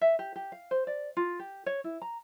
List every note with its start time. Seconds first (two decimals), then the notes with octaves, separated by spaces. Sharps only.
0.01 E5
0.19 G4
0.36 G4
0.52 F5
0.71 C5
0.87 D5
1.17 F4
1.39 G4
1.66 C#5
1.84 E4
2.02 A#5